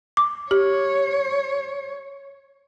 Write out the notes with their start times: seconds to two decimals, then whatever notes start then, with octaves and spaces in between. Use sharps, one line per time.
0.17 D6
0.51 G4 C#5